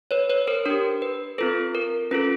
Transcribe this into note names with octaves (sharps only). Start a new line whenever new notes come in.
B4 C#5
B4 C#5
A#4 C5
D4 G4 A#4
B4
C4 F4 A4 B4
A#4
C#4 F4 A4 B4